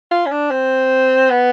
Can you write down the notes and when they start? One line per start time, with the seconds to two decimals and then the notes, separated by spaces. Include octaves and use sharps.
0.11 F4
0.26 C#4
0.31 D4
0.50 C4
1.30 B3